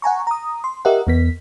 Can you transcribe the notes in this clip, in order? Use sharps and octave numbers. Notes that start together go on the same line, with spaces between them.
F#5 G#5 A#5 C#6
A#5 D#6
C6
G4 A#4 D#5 E5 F#5
E2 B3 B6